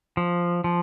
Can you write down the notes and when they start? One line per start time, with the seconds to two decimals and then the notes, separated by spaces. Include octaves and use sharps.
0.17 F3
0.64 F3